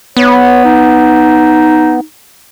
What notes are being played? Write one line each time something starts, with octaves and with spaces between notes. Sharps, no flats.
B3 C#5
D#4